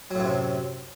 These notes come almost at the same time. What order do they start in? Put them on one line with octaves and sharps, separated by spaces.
F#3 A2 F#2 C3